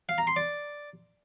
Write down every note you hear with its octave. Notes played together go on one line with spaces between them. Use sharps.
F5
A#5
C6
D5